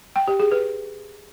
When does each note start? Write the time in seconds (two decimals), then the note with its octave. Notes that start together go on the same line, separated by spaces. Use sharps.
0.16 G5
0.28 G4
0.39 G#4
0.51 B4